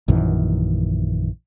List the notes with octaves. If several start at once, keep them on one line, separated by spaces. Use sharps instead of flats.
A#1 F#2 D#3 E3